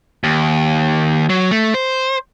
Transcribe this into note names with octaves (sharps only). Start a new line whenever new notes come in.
D#2
F#3
A3
C5